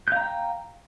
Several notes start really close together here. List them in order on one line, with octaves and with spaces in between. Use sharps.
G6 F5 A#5 G5